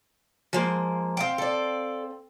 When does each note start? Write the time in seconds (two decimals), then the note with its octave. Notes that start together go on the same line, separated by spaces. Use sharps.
0.53 F3 G#3 A#3
1.17 C4 F5 G5
1.38 A4 D5